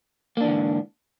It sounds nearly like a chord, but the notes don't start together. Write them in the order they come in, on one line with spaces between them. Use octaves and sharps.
A#3 D4 E3 D3 G#2